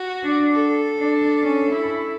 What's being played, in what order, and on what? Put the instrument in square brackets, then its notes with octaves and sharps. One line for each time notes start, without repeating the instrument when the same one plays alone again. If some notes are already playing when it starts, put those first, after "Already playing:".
Already playing: [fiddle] F#4
[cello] D4
[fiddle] A4
[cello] D4
C#4
E4